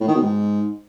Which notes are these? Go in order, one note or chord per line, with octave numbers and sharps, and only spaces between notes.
A2
D#3
B2
G#2